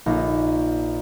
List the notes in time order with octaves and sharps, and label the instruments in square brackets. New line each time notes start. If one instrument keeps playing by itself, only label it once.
[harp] A#1 D#4